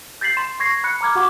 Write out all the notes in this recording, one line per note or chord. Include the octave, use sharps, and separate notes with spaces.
G6 A6 B6 C7 F#7
C6 E7
C#6 G#6 A#6 C7
B5 F#6 C#7
A#5 D6 F6 G#6
F#4 F#5 C#6 D6